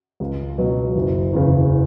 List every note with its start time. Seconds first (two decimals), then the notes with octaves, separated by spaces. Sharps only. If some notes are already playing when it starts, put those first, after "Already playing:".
0.20 C#2
0.58 B2 F#3
0.95 F#1
1.33 E2 C#3